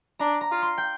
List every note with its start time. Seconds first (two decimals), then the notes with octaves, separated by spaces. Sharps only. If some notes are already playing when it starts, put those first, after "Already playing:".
0.19 D4 A#5
0.41 A#5
0.51 F4
0.62 C6
0.78 G5